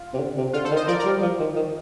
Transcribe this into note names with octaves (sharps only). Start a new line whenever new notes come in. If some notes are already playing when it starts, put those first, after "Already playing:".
Already playing: F4
C3
D3
C3
D3 F4
A4 C5
D#3
C5 D#5
F3 A#4 D5
A#4 D5
G3
F3
D#3
D#3